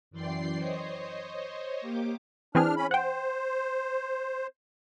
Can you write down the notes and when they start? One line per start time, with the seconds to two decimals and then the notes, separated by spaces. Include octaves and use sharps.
0.11 F#2 E3 D5 G5 C6 C7
0.57 C5 C#5 D#5
1.81 A#3 G4 D6
2.55 E3 C4 D4 G#4 F6
2.77 C#4 B5
2.91 C5 F#5 G5